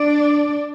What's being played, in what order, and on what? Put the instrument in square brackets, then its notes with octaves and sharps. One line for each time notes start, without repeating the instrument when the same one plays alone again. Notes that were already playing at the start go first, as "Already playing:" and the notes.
Already playing: [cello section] D4 D5